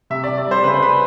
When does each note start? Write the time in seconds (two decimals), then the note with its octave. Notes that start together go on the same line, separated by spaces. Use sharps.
0.10 C3 E5
0.24 D5
0.29 C3
0.38 D5
0.46 G3 C5
0.63 C#3 B4
0.74 C5
0.82 C#3 B4